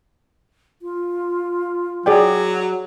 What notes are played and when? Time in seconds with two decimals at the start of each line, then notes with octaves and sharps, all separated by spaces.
0.82 F4
2.06 F#3 G#4 D5 G5